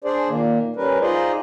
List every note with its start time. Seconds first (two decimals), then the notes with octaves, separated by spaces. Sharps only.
0.04 D4 G#4 C5 D5
0.29 A#2 D#3 A#3
0.76 G3 C#4 A#4 B4
1.01 D#4 F4 G#4 C5 D5 D#5